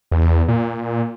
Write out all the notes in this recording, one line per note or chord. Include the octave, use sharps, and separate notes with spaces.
E2
A#2